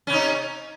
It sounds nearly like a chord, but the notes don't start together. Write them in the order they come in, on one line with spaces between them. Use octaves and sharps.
C#4 C3 D#4